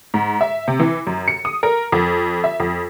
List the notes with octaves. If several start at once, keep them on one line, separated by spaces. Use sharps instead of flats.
G#2
E5
C3
E3
F#2
C#7
D#6
A#4
F2
E5
F2